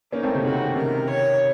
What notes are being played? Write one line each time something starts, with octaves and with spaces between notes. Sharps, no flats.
A#3 C#4 D#4
A3 C4
C3 D#3
C#3 F#4
C3 D#3 A#4
C#5